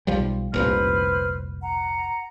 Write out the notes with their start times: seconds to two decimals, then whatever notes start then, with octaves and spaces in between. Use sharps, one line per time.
0.07 B1 F3 G3
0.54 F1 C2 A#2 B4 C5 F6
1.61 F#5 A#5